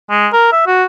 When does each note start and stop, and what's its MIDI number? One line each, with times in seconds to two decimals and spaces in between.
0.10 0.28 56
0.33 0.49 70
0.52 0.62 76
0.67 0.84 66